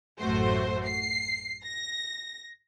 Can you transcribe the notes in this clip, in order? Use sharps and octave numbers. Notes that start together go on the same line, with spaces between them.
A1 F#2 A3 F#4 C5
C7
A#6